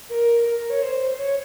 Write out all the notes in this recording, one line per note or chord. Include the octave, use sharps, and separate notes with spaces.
A#4
A#4
C#5
C5
C#5